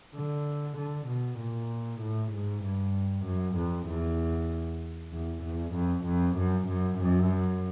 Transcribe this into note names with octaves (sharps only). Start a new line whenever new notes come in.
D3
D3
B2
A#2
A2
G#2
G2
F#2
F2
E2
E2
E2
F2
F2
F#2
F#2
F#2